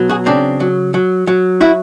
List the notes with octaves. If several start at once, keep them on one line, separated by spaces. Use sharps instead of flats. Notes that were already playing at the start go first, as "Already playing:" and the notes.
Already playing: B2 F#3
F#4 G#4
C#3 C4 D4
F#3
F#3
F#3
E4 F#4